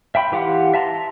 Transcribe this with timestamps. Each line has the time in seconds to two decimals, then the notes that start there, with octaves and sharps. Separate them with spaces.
0.15 E5 G5 B5 C6
0.32 E3 G4 F5 F#5 C6
0.74 E5 A5 A#5 C6